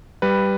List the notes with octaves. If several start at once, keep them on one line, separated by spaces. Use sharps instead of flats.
G3 B4